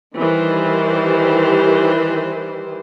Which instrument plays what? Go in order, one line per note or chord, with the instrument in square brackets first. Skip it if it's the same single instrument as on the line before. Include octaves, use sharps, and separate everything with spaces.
[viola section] D#3 E3 G3 G4 C5